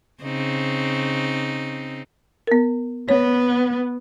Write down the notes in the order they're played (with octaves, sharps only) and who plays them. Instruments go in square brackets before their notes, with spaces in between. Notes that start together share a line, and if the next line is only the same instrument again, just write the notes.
[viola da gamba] C#3 C4 D#4
[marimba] B3 A#4
[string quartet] B3 [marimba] C#5